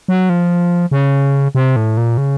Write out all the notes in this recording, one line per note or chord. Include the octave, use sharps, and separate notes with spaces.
F#3
F3
C#3
C3
A2
A#2
C#3